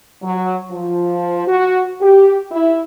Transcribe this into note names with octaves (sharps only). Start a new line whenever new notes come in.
F#3
F3
F#4
G4
E4